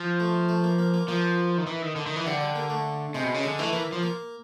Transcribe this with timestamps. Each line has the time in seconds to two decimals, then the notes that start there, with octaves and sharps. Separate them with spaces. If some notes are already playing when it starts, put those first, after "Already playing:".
Already playing: F3
0.20 A3
0.49 A3
0.64 A#3
0.78 A#3
0.94 A#3
1.08 F3 A#3
1.58 D#3
1.67 E3
1.82 D#3
1.96 D3
2.06 D#3
2.16 E3
2.26 D3 G3
2.41 G3
2.55 A#3
2.70 A3
3.14 C3 G#3
3.24 B2
3.34 C#3
3.43 D3 G#3
3.59 E3 A3
3.73 E3 A#3
3.92 F3
4.03 A#3